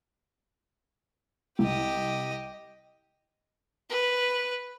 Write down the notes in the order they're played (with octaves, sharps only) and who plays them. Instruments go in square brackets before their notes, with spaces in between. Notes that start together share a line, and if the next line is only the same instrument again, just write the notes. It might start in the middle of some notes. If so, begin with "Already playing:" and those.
[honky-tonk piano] C2 [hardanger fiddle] G4 D#5
[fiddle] B4